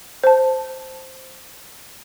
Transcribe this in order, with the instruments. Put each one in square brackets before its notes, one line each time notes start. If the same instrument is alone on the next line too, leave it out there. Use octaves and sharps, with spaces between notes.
[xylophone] C5 A5